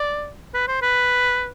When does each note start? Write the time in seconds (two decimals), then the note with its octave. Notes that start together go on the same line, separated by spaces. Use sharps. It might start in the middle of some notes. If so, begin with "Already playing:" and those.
Already playing: D5
0.54 B4
0.68 C5
0.82 B4